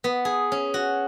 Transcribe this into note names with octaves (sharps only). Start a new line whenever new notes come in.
B3
G#4
C#4
F#4